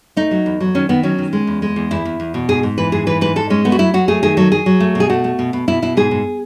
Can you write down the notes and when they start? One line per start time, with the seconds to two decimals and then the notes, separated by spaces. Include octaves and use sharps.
0.16 A3 D#4
0.31 F#3
0.46 E2
0.60 F#3
0.75 D#3 C#4
0.89 D#3 B3
1.03 F#3 C#4
1.19 D#3
1.33 G#3
1.47 E2
1.62 G#3
1.76 E2
1.91 E2 E4
2.05 E2
2.20 E2
2.34 B2
2.49 G#2 G#4
2.63 G#2
2.78 E3 B4
2.92 G#2 G#4
3.07 E3 B4
3.21 G#2 B4
3.36 G#2 A4
3.50 G#3 C#4
3.65 A3 B3
3.72 F#4
3.79 F#3 E4
3.94 F#3 F#4
4.08 A3 G#4
4.23 D#3 G#4
4.37 F#3 A4
4.52 F#3 G#4
4.66 F#3
4.80 A3
4.95 B2
5.00 G#4
5.10 A3 F#4
5.24 A3
5.39 B2
5.53 B2
5.68 B2 E4
5.82 B2 E4
5.97 G#2 G#4
6.11 G#2